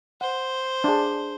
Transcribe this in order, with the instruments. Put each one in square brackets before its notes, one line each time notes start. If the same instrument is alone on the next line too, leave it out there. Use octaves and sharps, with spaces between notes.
[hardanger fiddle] C5 [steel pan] F#5
[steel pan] D4 G#4